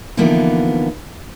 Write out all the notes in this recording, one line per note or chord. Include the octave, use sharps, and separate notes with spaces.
D3 E3 F3 A#3 B3 D#4